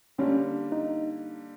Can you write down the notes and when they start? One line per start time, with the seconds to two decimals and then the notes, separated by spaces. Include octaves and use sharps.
0.18 D3 G3 A#3 C#4 D4
0.72 D#4